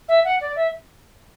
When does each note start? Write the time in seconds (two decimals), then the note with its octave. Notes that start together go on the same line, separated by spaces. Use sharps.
0.08 E5
0.24 F#5
0.41 D5
0.56 E5